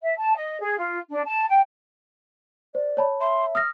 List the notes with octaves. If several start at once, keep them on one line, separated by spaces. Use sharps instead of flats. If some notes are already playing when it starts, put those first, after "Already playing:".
E5
A5
D#5
G#4
F4
D4
A5
G5
C5 D5
C#5 A5 B5
E5 C6
D#6 F6 A#6